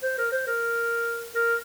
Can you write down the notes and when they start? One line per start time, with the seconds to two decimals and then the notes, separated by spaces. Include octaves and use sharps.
0.02 C5
0.18 A#4
0.32 C5
0.47 A#4
1.35 A#4